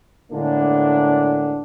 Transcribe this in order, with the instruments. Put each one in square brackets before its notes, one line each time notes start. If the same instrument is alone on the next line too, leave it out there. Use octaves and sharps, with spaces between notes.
[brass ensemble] A2 D3 G#3 A#3 B3 D4